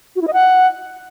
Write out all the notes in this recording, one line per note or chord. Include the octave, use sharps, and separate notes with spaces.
F#4
E4
D#5
F#5